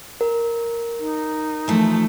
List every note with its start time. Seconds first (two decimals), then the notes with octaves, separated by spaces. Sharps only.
0.21 A#4
0.99 D#4
1.68 E3 F3 A3